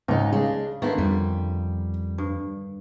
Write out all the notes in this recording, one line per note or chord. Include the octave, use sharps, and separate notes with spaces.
C#2 G#2 D#4
C#3 G#3 D4
D3 D#3 A3 B3 E4
F2 G3
G2